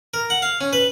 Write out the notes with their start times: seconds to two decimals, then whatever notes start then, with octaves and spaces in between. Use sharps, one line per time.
0.14 A#4
0.30 F#5
0.42 F5
0.61 C#4
0.73 B4